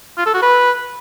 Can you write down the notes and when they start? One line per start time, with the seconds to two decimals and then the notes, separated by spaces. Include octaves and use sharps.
0.18 F4
0.26 A4
0.34 F#4
0.42 B4